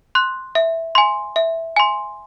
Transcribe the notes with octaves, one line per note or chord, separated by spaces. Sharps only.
C6 F#6
E5
G#5 C6
E5
G#5 C6